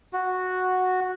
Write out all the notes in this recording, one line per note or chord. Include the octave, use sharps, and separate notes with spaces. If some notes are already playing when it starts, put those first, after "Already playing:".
F#4